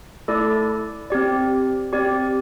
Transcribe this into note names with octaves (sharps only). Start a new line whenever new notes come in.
A3 E4 A4 D5
C4 G4 D5
C4 G4 D5